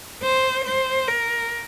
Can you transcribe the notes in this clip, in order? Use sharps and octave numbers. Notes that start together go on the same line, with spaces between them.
C5
C5
A#4